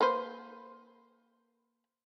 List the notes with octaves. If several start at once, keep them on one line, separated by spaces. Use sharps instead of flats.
A#3 B4 C5